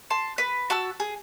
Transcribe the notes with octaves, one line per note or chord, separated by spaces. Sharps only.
A5 C6
B4
F#4 A5 E6
G#4